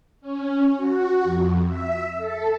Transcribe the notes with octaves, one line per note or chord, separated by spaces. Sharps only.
C#4
F#4
F2
E5
A4